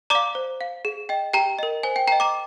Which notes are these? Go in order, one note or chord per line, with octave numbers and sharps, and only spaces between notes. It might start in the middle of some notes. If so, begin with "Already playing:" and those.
D5 F5 A#5 D6
C5
F5
G#4
D#5 G5
G4 G5 A#5
A#4 D#5
C5 G#5
G5
D#5 G5 A#5
A#5 D6